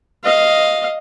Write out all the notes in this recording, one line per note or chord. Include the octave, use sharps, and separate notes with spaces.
D#5 F5